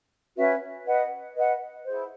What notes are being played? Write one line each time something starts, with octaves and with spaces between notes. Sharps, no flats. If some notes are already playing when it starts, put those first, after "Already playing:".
C#4 F#4 B4 E5
B4 D#5 F#5
B4 D#5 F#5
E4 G#4 C5